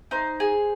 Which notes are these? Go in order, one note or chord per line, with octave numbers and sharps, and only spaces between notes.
D#4 C5
G#4